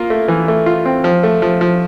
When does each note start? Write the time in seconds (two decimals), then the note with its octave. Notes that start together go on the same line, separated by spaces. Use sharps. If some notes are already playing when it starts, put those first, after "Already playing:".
Already playing: A#3 F4
0.10 A3
0.28 E3
0.48 A3
0.66 F4
0.85 C4
1.04 F3
1.23 A3
1.42 F3
1.61 F3